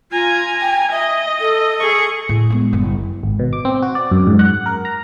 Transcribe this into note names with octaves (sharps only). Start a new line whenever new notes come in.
F4 G#5 A#5
G5
D#5 E5
A4
G#4 C#6
A2
G#3 B3
F#1 G3
G#1
B2
D6
C4
F#4
D5
F#2
G#2
F#5
A#4
A#5